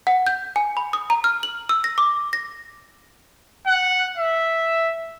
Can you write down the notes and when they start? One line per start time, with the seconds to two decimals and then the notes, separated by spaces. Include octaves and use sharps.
0.07 F#5
0.27 G6
0.56 G#5
0.77 B5
0.93 D#6
1.10 A#5
1.24 F6
1.43 F#7
1.69 E6
1.84 A#6
1.98 D6
2.33 A#6
3.67 F#5
4.17 E5